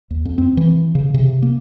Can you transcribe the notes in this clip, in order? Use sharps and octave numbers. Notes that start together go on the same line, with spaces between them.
D#2
F2
C4
E3
C#3
C3
A#3